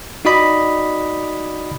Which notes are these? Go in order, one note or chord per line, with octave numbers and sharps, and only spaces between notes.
D#4 F#4 D5 D#5 B5